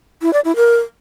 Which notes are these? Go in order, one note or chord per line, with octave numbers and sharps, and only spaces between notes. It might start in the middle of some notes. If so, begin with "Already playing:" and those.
E4
D5
E4
A#4